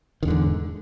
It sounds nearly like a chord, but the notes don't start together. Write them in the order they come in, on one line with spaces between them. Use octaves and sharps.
D#3 E2 D3 G#2